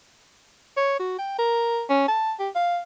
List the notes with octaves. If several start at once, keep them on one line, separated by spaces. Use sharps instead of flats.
C#5
F#4
G5
A#4
C#4
A5
G4
F5